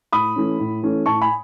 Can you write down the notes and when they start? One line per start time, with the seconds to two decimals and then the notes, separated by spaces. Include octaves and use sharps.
0.13 A2 B5 D#6
0.36 E3 A3 C#4
0.59 A2
0.83 E3 A3 C#4
1.06 A2 A5 C#6
1.21 G#5 B5